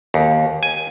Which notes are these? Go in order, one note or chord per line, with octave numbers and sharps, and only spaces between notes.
D#2
G#5